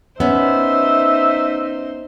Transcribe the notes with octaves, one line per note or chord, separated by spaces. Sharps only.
B3 C#4 D#4 C5 E5